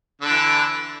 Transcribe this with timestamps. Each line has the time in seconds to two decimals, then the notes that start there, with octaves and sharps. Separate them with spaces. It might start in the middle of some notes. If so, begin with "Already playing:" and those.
0.21 D3
0.26 D4
0.30 E3